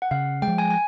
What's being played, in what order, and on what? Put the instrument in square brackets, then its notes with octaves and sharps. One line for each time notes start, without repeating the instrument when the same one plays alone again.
[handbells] F#5
[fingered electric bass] C#3 [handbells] F5
[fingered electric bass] G#3 [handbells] G5
[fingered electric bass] F3
[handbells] G#5
G#5